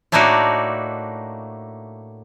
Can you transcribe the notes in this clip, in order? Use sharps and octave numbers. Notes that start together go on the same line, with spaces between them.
A2 A3 A#3 D4 D#4 F#4